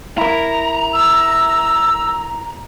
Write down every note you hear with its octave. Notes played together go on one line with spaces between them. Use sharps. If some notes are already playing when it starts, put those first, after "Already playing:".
E4 A#4 A#5
E6